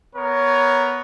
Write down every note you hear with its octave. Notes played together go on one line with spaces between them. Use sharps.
B3 A#4 C#5